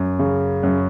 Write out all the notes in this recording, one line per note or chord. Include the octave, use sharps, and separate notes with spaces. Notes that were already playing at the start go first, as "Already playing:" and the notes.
Already playing: F#2
C#3
F#2